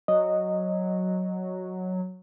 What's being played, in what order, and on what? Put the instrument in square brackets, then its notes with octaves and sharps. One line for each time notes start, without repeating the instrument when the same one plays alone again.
[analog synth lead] F#3 [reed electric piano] D#5